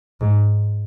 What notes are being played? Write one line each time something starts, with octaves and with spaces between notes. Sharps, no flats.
G#2